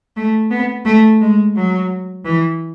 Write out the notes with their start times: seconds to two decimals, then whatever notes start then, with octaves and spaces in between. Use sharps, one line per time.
0.17 A3
0.51 B3
0.86 A3
1.21 G#3
1.56 F#3
2.25 E3